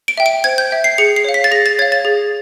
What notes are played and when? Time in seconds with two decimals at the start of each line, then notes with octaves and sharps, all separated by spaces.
0.08 D7
0.17 E5 G5
0.26 D7
0.44 C5 G#6
0.58 G6
0.71 E5 G5
0.84 C7
0.98 G#4 C#7
1.16 C7
1.24 C#5 F5
1.34 B6
1.44 A6
1.51 G#4 A#6
1.66 A6
1.79 C#5 G#6
1.82 F5
1.92 A6
2.05 G#4